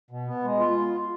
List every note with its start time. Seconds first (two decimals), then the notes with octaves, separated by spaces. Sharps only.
0.11 B2
0.27 B3
0.44 G#3
0.59 F4